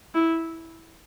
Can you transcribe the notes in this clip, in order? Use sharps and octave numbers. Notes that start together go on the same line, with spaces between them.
E4